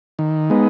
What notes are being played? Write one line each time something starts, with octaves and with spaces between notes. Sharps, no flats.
D#3
G#3 B3 D#4